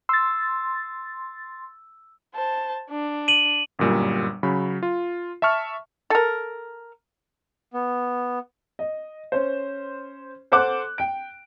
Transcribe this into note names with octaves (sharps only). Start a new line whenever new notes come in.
C6 E6 A6
C5 A5
D4
D#7 F#7
G1 F#2 A#2 G3
C#3 F#3 B5
F4
E5 A5 C#6 F6
A4 A#4
B3
D#5
C#4 C5
A4 C5 F#5 D6 F#6
G5 D7